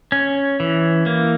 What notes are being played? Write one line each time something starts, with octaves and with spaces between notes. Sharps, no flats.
C#4
E3
A#3